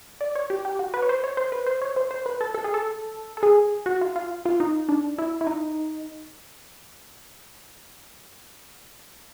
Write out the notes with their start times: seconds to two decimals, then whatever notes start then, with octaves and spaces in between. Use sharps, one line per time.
0.21 D5
0.35 C#5
0.50 G4
0.65 G4
0.79 F#4
0.94 B4
1.02 C#5
1.09 C5
1.24 C#5
1.37 C5
1.52 B4
1.66 C5
1.82 C#5
1.96 C5
2.11 C5
2.26 B4
2.41 A4
2.54 A4
2.64 G#4
2.74 A4
3.37 A4
3.43 G#4
3.86 F#4
4.01 F4
4.16 F4
4.45 F4
4.60 D#4
4.89 D4
5.18 E4
5.41 E4
5.47 D#4